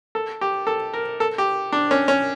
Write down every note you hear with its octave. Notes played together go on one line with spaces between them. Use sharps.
A4
G4
A4
A#4
A4
G4
D4
C#4
C#4